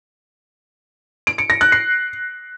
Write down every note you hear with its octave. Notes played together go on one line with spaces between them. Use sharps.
D7
C#7
A#6
F#6
C7